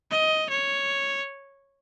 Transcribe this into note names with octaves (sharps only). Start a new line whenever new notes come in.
D#5
C#5